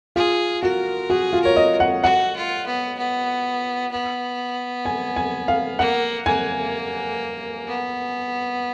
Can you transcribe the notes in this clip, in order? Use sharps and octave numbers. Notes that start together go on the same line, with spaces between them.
F4 G#4
F#4 A#4
F#4 G#4
F4
A#4 C#5
D#5
F#5
F#4 F#5
F4
B3
B3
B3
G#5
G#5
F5
A#3 F#5
A#3 G#5
B3